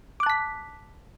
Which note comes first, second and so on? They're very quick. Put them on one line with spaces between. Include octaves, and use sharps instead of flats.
D6 F#6 A5 B6